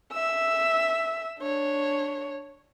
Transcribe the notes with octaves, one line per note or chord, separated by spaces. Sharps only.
E5 E6
D4 C#5